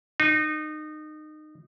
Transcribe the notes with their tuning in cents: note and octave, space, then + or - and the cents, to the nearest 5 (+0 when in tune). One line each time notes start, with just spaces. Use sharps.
D#4 -25